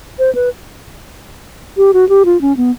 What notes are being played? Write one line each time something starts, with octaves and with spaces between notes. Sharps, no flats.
C5
B4
G4
F#4
G4
F4
C#4
B3